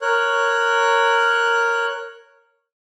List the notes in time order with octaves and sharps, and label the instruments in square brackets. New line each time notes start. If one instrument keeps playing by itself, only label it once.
[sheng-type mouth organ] A#4 C#5 F#6